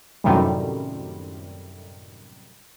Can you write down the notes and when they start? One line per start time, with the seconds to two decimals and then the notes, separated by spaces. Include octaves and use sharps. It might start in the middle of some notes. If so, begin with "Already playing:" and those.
0.24 F#2 A2 C3 D#3 G3